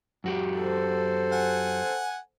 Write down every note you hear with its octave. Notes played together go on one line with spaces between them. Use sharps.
F#2 F#4 G4
A4 C5
F#5 G#5